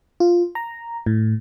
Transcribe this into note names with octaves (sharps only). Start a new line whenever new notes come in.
F4
A#5
A2